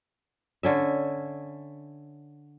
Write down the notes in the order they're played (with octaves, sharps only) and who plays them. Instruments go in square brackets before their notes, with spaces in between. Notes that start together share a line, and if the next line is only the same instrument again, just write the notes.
[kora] D3 C#4 E5